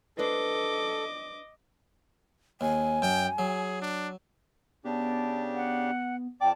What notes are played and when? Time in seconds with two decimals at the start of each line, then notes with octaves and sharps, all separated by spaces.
0.18 D4 A4 B4 C5 D#5 D6
2.61 D#2 G#5
3.02 F#2 G5
3.38 F#3 G#4
3.82 D4
4.85 C#3 B3 D4 G4 A5
5.54 F#5
6.41 F2 D5 G5 A5 D6